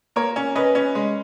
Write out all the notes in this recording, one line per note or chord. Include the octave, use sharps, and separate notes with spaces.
A#3 A#4 C#5
C#4
C#4 B4 D#5
C#4
G#3